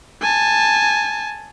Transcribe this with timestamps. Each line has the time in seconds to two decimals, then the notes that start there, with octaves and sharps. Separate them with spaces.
0.21 G#5 A5